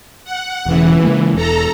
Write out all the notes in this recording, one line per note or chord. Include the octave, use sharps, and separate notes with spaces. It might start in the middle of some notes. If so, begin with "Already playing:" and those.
F#5
E1 C#3 E3
C#3 G#3 A#3
E1 E2 A4 A#5